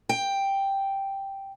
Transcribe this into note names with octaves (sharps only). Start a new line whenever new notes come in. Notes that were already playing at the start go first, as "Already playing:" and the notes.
G5